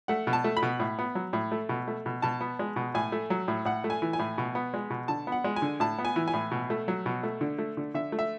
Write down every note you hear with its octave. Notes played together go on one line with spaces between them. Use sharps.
A3 F#5
B2
A5
A3
B5
B2
A2
B3
F#3
A2
A3
B2
A3
B2
B2 A5
B3
G#3
B2
A2 G#5
A3
F#3
A2
A2 F#5
A3
G#5
E3
G#5
A2
B2
B3
G#3
B2
D3 A5
B3
F#5
G#3
G#5
D3
A2 A5
B3
G#5
E3
G#5
A2
B2
A3
F#3
B2
A3
D3
A3
D3
D3 E5
A3
E5